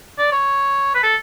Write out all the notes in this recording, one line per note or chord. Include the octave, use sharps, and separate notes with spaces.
D5
C#5
B4
A4